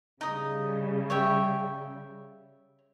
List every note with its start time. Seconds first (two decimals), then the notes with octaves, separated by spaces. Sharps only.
0.21 C#3 G3 D#4 D#6
1.10 C#5 E5 G5